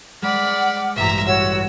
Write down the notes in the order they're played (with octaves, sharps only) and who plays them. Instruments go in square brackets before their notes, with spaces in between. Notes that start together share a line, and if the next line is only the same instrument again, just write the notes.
[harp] G#3 [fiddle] D5 B5 [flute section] F#5 D6 F6
[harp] A1 G2 B2 [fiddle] E5 A#5
[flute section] F#4 C#5 F#5 [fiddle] E6